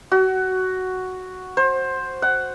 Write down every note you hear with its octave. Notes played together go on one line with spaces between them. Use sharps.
F#4
C5
F#5